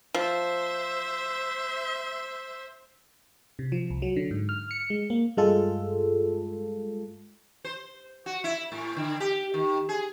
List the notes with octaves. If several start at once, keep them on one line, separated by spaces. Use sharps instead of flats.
F3 C5 E5
C3
F3
C2
F#3
D3
G#2
F6
C#7
G#3
A#3
G2 G#3 F4 A4
C5
F#4
E4
A2
D3
G4
D#3
G#4